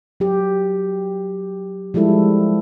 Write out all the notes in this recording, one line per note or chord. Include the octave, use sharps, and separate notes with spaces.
F#3 G4
F3 G3 G#3 E4 A4